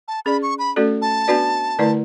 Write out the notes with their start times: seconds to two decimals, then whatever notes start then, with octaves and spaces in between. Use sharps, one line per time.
0.08 A5
0.25 C#4 G#4 D5 B5
0.43 C#6
0.59 B5
0.76 A3 C#4 F#4 A4 D5
1.02 A5
1.28 B3 D4 F#4 B4 D5
1.79 D3 A3 E4 B4 D5